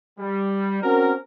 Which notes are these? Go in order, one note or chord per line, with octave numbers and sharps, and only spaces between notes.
G3
C4 C#4 F#4 A#4